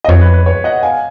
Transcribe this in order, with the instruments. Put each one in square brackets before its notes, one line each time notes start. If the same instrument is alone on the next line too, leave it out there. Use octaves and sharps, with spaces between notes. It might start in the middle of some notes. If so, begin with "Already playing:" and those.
[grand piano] D#5
[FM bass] F2 [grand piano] C#5
[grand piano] B4
B4
C#5
D#5 F#5
F5 G#5